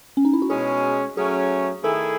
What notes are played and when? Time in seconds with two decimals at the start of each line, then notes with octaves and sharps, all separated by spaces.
0.17 C#4
0.25 D#4
0.33 E4
0.42 F#4
0.50 B2 G#3 C#4 G#4
1.16 F#3 A3 C#4 G#4
1.84 D#3 A3 E4 G#4 A4